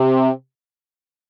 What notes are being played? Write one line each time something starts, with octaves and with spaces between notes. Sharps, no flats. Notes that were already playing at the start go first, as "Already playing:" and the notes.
Already playing: C3